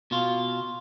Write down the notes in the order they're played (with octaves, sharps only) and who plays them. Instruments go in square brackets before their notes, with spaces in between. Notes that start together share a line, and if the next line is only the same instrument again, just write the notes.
[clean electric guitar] B2 F4